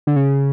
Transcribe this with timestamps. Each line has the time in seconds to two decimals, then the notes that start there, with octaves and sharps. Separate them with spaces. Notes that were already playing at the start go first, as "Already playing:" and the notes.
0.07 D3
0.16 C#3